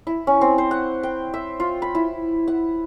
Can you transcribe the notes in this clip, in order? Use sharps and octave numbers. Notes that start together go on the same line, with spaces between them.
E4
C#4
C4
C5
F#5
G5
E5
F4
B5
E4
F#5